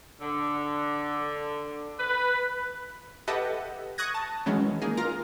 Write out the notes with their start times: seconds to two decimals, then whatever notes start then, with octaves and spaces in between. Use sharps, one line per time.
0.21 D3
1.99 B4
3.28 G4 A4 B4 D#5 E5 F#5
3.98 C#6 D#6 F#6 G#6 A#6
4.14 A5
4.46 D#3 E3 F#3 G#3 C#4
4.82 A#3 D#4 G#4
4.97 F4 A#4 A#5